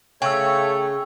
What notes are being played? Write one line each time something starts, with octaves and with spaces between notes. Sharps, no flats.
C#3 A3 C#5 G5 C#6 E6